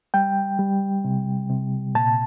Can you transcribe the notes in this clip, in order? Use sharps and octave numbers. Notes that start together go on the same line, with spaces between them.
G3 G5
G3
C3
C3
A#2 A5